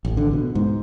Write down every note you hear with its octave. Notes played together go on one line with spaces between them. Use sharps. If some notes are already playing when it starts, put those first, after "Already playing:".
A1
D3
B2
G#2